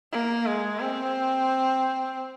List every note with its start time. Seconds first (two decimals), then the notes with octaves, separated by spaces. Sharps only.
0.12 A#3
0.46 G#3
0.80 C4